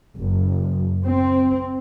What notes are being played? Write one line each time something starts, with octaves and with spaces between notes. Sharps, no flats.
F#1
C4